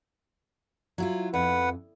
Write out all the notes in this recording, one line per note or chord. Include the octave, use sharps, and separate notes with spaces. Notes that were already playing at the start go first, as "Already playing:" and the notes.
F#3 E4 F4
F2 B4 F#5